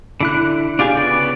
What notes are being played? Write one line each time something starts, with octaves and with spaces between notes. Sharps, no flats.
D3 E4 F#6
D4 F4 G4 G#4
C#3 B3 D5